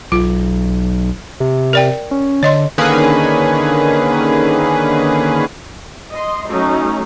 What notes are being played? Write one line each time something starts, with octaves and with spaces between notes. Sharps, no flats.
B1 F4
C3
A#4 D5 G5
C#4
D3 C#5 D#5 C6
D3 D#3 A#3 C#4 G#4 B4
D#5 C6
F#3 A3 C#4 D#4